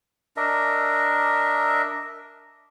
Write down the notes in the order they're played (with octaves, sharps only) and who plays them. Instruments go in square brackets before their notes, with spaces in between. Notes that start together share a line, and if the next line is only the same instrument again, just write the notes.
[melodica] D4 A#4 D#5 E5